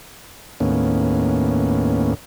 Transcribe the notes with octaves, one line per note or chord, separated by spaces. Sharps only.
D#2 A2 A#3 B3 C#4